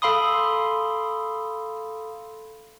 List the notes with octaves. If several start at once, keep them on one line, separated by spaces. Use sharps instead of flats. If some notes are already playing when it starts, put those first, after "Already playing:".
A4 F5 B5 C6 D#6